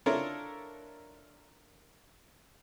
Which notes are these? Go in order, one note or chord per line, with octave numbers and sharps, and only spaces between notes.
D4 E4 F4 A4 A#4 C#5